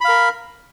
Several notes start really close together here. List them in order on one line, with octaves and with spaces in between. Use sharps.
B5 F5 A#4